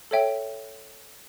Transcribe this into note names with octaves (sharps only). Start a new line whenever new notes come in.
A4 C#5 E5 G5